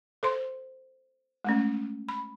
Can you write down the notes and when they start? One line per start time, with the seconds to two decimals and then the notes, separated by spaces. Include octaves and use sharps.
0.23 A4 C5 C6
1.44 G#3 A3 C#4
2.09 B5